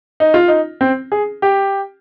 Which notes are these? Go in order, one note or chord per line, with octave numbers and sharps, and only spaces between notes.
D#4
F4
D#4
C4
G#4
G4